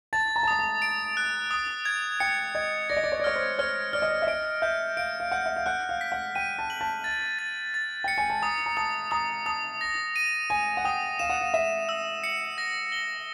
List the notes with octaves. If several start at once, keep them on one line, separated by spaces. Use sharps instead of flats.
A5 A6
A#5
A5
A#5 D#6
A5
D7
F#6
D#6
G#6
G5 C#7
D#5 G#6
D5 A#6
D#5
D5
C#5
D5
C#5 F6
C5
C#5 F6
D5 F6
D#5
D5
E5
D#5 D7
E5 G6
F5 D7
F5
F#5 G6
E5
F5
F#5 F#6
F5
B6
F#5
G5 D#7
A5
F#7
A5
A6
A6
A6
G5 C#7
G#5
A5
A#5 D#6
A#5
A5 D#6
A#5 D#6
A5 D#6
A#6
D#7
G#5 D#7
F#5
G5 D#6
F5 E7
F#5
F5
E5 E7
E6
C#7
A#6
G7